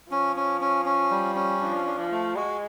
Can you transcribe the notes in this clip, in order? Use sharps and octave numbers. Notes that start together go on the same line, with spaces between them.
F3 C#4
C#4
C#4
C#4
G3
C#4
F3 D4
D4
F3
A3
G#3 F#4